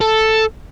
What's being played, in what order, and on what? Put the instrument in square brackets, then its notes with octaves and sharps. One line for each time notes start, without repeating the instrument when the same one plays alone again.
[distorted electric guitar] A4